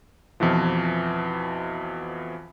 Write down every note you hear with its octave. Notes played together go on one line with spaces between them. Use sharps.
F2 B2 E3 F3